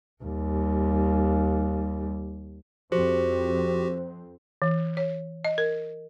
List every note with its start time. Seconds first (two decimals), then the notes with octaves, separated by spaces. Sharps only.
0.23 D#2 G3
2.92 F2 C4 F#4 G4 C5
4.62 E3
4.97 C#5
5.45 D#5
5.58 A#4